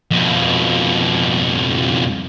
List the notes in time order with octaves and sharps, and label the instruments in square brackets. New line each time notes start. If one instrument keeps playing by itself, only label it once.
[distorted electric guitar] F2 B2